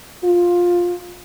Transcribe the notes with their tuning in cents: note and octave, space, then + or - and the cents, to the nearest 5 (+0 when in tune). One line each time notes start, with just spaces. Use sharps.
F4 +10